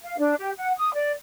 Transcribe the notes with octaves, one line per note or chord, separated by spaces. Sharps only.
F5
D4
G4
F#5
D#6
D5